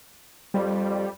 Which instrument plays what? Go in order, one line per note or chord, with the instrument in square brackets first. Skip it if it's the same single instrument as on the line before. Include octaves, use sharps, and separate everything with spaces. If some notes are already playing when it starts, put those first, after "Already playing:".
[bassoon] F2 [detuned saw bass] G3